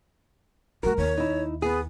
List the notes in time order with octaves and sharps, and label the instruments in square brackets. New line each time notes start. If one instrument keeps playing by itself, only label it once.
[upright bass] G3 A3 [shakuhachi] F#4 [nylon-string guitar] A#4
[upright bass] D#2 [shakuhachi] C#5
[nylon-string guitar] D#4 E4
[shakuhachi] B3 [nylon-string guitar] G#4